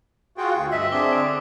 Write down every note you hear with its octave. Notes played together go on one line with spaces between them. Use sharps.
F4 F#4 G#4 G5
D2
G2 D#5 E5 E6 B6
C4 D4 G#4 D6 G7
D3 D#6 D7